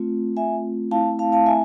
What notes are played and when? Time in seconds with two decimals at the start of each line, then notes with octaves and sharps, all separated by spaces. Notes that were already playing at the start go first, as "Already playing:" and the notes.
Already playing: A3 C4 F4
0.37 E5 G#5
0.91 A3 C4 E4 F5 A5
1.19 F5 A5
1.32 F5 A5
1.46 E5 G#5